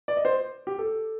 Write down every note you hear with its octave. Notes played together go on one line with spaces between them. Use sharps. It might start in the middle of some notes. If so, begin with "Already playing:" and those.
D5
D#5
C5
G4
A4